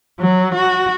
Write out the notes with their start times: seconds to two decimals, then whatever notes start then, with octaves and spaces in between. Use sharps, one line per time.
0.20 F#3
0.55 F#4